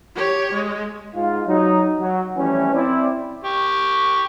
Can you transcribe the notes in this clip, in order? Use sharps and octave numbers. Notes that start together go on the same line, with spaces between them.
G4 C#5
G#3
G#2 F4
F#3 D#4
F#3
E3 F3 G3 A3 C#4
C4 E4 D5
G4 C#6